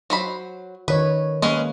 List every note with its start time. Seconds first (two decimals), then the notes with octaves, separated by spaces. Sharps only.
0.10 F#3 C5 B5
0.88 D#3 B4 C#5 D#5
1.42 G#3 A#3 B3 C#4